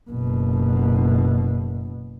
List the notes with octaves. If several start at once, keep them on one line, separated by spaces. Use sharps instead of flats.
F#1 B2